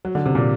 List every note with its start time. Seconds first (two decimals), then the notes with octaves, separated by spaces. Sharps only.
0.05 F#3
0.15 D3
0.26 C3
0.35 A#2